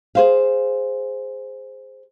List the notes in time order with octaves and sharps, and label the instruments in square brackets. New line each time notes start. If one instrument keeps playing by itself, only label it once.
[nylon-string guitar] G#4 C5 F5